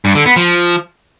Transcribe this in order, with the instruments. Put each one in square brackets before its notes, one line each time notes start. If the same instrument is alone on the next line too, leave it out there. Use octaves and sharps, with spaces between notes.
[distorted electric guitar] G2
D3
B3
F3